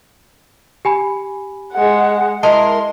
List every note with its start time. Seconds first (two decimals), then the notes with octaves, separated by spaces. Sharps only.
0.85 G4 G#5 B5
1.73 G#3 F#5
2.43 G#3 E4 A#4 A5 C6